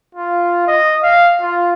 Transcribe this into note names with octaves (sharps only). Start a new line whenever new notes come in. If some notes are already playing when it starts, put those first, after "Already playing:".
F4
D#5
F5
F4